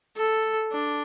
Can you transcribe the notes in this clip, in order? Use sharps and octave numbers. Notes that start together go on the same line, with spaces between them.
A4
D4